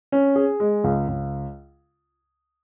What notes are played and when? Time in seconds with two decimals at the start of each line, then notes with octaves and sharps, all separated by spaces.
0.12 C#4
0.36 G#4
0.60 G#3
0.84 C#2
1.08 C#2